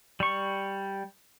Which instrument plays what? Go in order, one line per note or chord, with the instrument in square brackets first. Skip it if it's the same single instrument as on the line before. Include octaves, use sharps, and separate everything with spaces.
[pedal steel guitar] G3 C#6